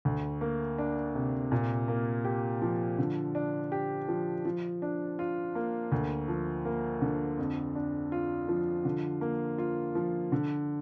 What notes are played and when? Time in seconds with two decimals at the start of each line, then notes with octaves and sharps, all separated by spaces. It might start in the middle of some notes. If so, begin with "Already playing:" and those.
0.05 D2
0.41 A#3
0.78 D4
1.15 C3
1.52 A#2
1.88 A#3
2.25 G4
2.62 F3
2.98 D3
3.35 D4
3.72 G4
4.08 F3
4.45 F3
4.82 D4
5.19 F4
5.55 A#3
5.92 D2
6.28 F3
6.65 A#3
7.02 D3
7.38 F2
7.75 D4
8.12 F4
8.48 F3
8.85 D3
9.21 A#3
9.58 F4
9.95 F3
10.32 D3